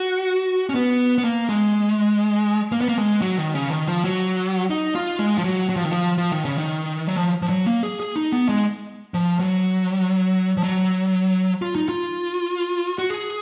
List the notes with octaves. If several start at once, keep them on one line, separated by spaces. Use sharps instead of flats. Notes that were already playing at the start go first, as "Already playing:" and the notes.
Already playing: F#4
C#4
B3
B3
A#3
G#3
A#3
B3
A#3
G#3
F#3
D#3
C#3
D#3
F3
F#3
D#4
F4
G#3
F3
F#3
F#3
F3
D#3
F3
F3
D#3
C#3
D#3
F#3
F3
F3
F#3
A#3
G#4
G#4
D#4
B3
G#3
F3
F#3
F3
F#3
F4
D#4
F4
F#4
G#4